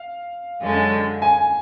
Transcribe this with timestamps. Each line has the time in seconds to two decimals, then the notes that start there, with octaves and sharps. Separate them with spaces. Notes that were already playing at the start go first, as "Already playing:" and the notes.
Already playing: F5
0.61 F#2 D3 G#3 C#4
1.22 G#5